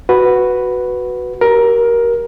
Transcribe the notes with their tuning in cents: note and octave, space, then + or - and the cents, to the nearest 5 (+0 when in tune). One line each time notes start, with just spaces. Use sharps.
F#4 +0 B4 +0
G4 -35 A#4 +15